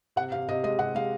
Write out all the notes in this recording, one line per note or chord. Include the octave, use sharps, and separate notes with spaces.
C3 F#5
C3 F5
C3 D#5
G#3 D#5
C3 F#5
G#3 F5